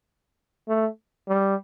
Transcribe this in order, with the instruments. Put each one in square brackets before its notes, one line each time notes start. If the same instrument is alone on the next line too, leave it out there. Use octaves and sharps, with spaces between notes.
[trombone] A3
G3